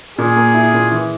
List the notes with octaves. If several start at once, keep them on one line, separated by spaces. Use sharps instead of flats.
A#2 G#4
A#3
E4
A#2
E3